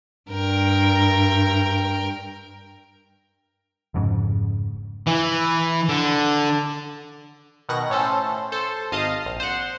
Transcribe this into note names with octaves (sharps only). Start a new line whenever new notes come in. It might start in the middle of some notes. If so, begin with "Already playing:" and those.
G2 A#4 G5
F1 F2 G#2 C#3
E3
D3
B2 D#3 F#5 A#6
A2 C#4 A4 C5
A4 C5
G#1 D#5 F5 A5 D#6
A#1
C5 F#5